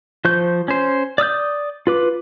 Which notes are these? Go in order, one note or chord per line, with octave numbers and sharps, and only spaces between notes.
F3 C5 C#6 G6
C#4 C5
D5 D#6 E6 G6
F4 B4 D6